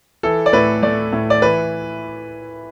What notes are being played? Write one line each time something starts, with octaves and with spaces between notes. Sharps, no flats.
E3 A4
D5
A2 B4
A3 D5
A2
D5
E3 B4